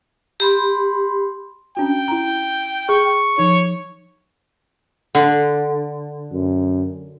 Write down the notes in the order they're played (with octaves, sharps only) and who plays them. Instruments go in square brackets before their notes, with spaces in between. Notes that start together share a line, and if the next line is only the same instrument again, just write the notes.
[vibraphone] G4 B5 C6
[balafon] C#4 D4 F#4 [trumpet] G5
[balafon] E4 A#5
[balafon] G#4 [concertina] C#6
[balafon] F3 D#4 [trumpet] C#5
[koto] D3
[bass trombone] F#2